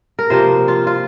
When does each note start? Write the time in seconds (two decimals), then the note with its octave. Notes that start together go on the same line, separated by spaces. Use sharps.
0.19 A#4
0.30 C3 F3 A#3 C5
0.68 F4
0.87 F4